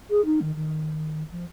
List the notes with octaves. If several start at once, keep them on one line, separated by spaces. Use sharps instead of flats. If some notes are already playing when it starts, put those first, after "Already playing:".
G#4
D#4
D#3
D#3
F3